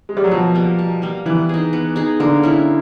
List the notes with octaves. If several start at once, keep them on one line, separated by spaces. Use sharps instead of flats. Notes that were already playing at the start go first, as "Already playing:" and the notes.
G#3
G3
F#3
B2 F3
G3 A#3
B2
G3 A#3
E3 B3
D#4 G#4
B3
D#4 G#4
D3 A#3
C#4 E4